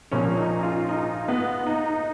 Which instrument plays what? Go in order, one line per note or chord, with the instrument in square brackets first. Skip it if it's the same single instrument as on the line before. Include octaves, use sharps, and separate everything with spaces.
[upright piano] A#1 A#2 F3 A#3 [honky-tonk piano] C#4
[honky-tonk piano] D#4
F4
D#4
B3
D#4
D#4